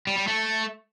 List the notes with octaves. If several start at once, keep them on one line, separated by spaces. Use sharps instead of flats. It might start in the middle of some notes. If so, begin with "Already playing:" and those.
G3
G3
A3